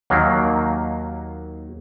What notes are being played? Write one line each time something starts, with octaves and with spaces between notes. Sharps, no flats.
D#2 D#3 F#3 A#3